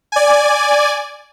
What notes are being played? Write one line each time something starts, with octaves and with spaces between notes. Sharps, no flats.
D5 G#5